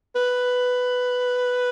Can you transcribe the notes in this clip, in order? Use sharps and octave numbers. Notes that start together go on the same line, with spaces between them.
B4